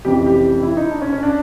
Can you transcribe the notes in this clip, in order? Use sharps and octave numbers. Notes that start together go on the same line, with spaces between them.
F1 F2 C#3 E3 G4
G4
E4
D#4
D4
C#4
C#4
D4